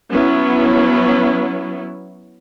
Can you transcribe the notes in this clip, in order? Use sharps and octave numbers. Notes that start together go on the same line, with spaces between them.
F#3 B3 C#4 E4